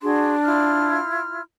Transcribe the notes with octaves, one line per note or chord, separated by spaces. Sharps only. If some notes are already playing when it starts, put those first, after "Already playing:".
D4 F#4 G#4 C6
E4 F4 F6